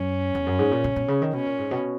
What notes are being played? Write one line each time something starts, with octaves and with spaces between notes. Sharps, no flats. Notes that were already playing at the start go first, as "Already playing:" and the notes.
Already playing: F#2 C#4
E2
F#2
G#2
A#2
C#3
B2
C#3
D#3
B2 C#4
A#2
G#2
B2